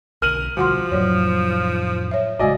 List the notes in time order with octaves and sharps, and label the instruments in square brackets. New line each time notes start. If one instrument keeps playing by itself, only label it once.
[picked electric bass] B1 D3 [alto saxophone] A#4 [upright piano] F6 D#7 F#7
[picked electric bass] B2 D3 G3 [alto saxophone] F3 [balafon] F#4 F#5 C6
[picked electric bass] F2 A2 [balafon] F#3 C#5
[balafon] C#5 E5
[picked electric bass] A1 C#3 [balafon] G#3 F#4 [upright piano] D5 D#5 G#5